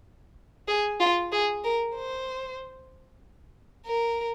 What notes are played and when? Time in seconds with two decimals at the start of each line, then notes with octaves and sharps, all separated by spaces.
0.68 G#4
1.00 F4
1.32 G#4
1.64 A#4
1.95 C5
3.86 A#4